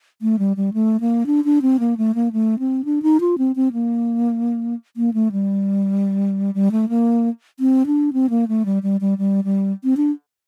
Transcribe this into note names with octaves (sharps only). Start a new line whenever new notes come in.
A3
G3
G3
A3
A#3
D4
D4
C4
A#3
A3
A#3
A3
C4
D4
D#4
F4
C4
C4
A#3
A#3
A3
G3
G3
A3
A#3
C4
D4
C4
A#3
A3
G3
G3
G3
G3
G3
C4
D4